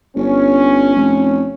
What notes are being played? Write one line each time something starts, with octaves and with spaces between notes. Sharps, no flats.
G1 C#4
F1